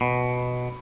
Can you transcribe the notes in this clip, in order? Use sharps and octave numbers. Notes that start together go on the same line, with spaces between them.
B2